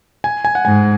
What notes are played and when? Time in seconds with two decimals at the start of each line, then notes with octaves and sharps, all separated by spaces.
0.24 G#5
0.45 G#5
0.55 F#5
0.65 G#2 G#5